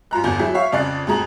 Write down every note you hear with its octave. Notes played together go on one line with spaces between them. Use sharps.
F#2 F4 A#5 F#6
G1 E2 G#5 G6
F#3 E4 G#4
C#5 E5 F5
F2 C#3 D5 F#6 C7
F2 A2 G#4 A#5 D#6 F#7